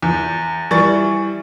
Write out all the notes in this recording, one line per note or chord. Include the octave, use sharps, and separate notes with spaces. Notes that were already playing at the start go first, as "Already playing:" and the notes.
E2
E3 G3 C#6 A6